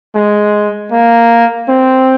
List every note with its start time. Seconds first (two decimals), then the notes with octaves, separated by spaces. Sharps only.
0.15 G#3
0.92 A#3
1.69 C4